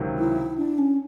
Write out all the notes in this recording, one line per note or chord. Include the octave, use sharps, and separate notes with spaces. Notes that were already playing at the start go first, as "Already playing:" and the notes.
Already playing: C#2 C3 D#3 F#3
E4
D4
C#4